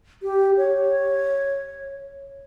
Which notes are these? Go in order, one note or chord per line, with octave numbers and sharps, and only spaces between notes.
G4
C#5